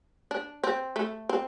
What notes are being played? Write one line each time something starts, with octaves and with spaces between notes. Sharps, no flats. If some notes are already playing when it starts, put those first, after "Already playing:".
D4
C4
A3
C4